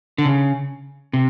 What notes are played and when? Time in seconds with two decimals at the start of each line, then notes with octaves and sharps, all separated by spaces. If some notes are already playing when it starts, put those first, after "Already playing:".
0.18 D3
0.25 C#3
1.13 C3